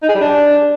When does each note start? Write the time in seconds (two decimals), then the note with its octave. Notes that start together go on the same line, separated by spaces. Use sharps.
0.03 D#4
0.09 G#4
0.15 G3
0.21 D4